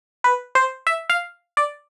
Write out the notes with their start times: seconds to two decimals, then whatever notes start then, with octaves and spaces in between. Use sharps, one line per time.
0.24 B4
0.55 C5
0.87 E5
1.10 F5
1.57 D5